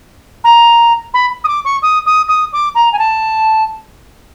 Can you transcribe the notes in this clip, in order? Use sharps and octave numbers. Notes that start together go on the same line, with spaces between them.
A#5
B5
D#6
D6
C#6
D#6
D#6
D#6
D6
A#5
G#5
A5